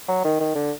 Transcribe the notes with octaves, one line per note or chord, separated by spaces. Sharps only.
F#3
D#3
D#3
D3